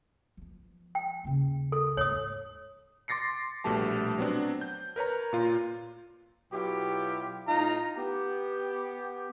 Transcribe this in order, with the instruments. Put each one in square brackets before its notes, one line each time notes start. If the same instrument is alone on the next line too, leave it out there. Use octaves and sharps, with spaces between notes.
[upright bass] F3 B3
[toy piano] G5
[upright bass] D#2 C#3
[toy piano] A4
[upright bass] D#2 G#2 [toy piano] C#5 D#6
[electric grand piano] C6 D6 A6 A#6 C7 C#7
A#1 B2 G3 A3 G4 A5
F#3 B3 C4 D4
G6
A#4 B4 C#5 A#5
A#2 F4
[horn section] B2 F#3 E4 F4 G4
A2 D#4 F4 A#5
B3 G4